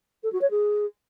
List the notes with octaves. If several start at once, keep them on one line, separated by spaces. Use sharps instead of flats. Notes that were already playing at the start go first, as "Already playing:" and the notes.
A4
F#4
C#5
G#4